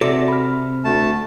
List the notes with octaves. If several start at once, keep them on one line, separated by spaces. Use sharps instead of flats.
C3 F#4 A4 D5 E5 A#6
B5 F6
D2 A3 A5